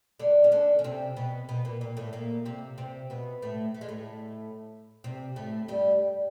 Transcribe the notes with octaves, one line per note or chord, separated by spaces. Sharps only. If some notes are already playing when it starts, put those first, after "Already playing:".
D3 D4
C#4
D3 D4
C#4
C3 C4
B2 B3
B2 B3
A#2 A#3
A#2 A#3
A2 A3
A#2 A#3
C3 C4
C3 C4
B2 B3
A2 A3
A3
G#3
A2 A3
C3 C4
A2 A3
G2 G3